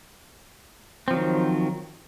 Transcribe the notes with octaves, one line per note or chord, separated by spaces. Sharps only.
D#3 F3 F#3 C4